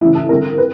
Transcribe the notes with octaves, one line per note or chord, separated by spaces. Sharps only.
C#3 E3 A3 E4
A4
D3 G3 C4 A#4
B4